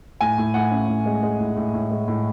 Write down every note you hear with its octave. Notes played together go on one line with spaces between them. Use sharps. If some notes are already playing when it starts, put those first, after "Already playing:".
A2 G#5
A2
A2 F#5
C#4
A2
G#3
G#3
A2
A2
A2
G#3
A2